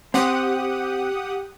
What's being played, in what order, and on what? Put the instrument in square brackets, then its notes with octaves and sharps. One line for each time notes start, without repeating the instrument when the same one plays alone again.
[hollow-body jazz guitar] C4 [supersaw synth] G4 F#5 D#6